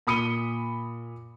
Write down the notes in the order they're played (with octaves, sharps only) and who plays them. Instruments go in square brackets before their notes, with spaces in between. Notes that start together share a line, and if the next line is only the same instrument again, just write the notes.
[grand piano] A#2 B5 D#6 C#7 D#7 G7